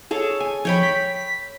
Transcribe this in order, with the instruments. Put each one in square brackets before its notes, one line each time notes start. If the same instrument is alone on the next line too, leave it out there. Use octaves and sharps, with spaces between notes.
[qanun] G#4 A4 C#5
G#5
[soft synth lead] F3 [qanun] C#5 G5 B5
[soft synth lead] B6